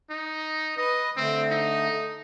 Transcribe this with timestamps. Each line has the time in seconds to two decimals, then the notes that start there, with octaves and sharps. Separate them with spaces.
0.10 D#4
0.78 B4 D#5
1.17 D3 A3 C4
1.51 D#4